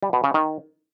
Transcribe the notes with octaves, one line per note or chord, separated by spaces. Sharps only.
G3
B2
C#3
D#3